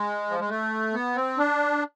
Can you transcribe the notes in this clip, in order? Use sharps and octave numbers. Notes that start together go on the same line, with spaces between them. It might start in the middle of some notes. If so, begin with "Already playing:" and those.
Already playing: G#3
F3
G#3
A3
B3
C4
D4